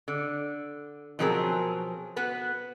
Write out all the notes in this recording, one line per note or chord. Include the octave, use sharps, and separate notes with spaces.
D3
B2 F3 F#3 C4 G#4 A#4
B3 F#4 B4